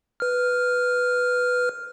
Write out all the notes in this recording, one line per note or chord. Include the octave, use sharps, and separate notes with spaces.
B4 F6